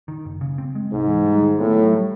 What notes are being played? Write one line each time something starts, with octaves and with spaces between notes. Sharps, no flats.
D#3
F#1
C#3
C4
G#3
C2 G#2
E3
G3
D#3
A2 B3
F#3
G3